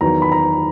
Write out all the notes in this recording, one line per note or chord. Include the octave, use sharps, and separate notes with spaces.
E2 D#3 F#3 A#5
B5
A#5